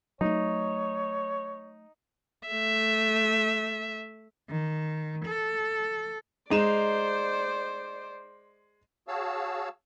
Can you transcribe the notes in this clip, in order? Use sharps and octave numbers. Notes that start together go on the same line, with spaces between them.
F#3 A3 D#4 C#5
A3 E5
D#3
A4
G#3 D#4 C5 D5 E7
F#4 G#4 C#5 F5 A5 E6